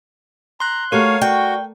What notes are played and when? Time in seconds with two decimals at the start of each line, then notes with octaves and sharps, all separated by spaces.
0.60 A#5 C6 F#6
0.92 A3 F#4 G4 A#4 C#5 F5 C#6
1.22 F#4 D5 G5